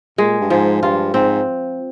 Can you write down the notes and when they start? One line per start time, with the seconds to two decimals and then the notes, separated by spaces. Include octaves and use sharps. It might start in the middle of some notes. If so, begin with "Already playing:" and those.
0.18 A#2 G#3
0.41 G2
0.50 G#2 F3
0.82 G2 F4
1.14 G#2 C4